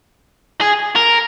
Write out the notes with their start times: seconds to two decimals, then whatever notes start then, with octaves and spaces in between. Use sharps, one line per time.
0.61 G#4
0.96 A#4